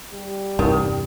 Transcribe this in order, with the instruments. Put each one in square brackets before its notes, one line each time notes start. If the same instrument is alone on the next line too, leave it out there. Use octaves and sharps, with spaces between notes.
[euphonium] G3
[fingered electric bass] E2 G2 C3 [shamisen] D#3